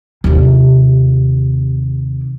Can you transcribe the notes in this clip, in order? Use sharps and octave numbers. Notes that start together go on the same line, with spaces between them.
D#2 C3